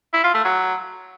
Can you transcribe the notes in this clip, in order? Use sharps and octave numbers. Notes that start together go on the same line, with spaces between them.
E4
F4
A3
F#3